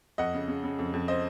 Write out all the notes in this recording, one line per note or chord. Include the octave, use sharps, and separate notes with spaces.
F2 D#5 F#5
C#3
C#3
C#3
F2
F2
C5 D#5